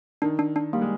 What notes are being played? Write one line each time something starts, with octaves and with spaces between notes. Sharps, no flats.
D#3 D4
D4
D4
G3 A#3
G#3